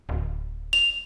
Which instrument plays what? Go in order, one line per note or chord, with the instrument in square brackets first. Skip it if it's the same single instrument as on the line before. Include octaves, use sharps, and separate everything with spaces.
[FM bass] D1
[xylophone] F7